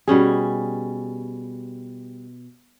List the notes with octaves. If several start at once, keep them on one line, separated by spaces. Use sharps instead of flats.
B2 G3 C#4 G#4